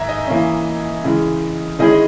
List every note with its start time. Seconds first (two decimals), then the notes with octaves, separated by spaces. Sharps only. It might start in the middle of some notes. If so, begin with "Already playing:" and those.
Already playing: G#2 D#3 E5 G#5 A#5
0.09 D#5
0.27 E3 A#3 C#4
1.04 C#3 E3 G#3
1.79 D#3 G#3 C#4 E4 G#4 D#5
1.92 D#5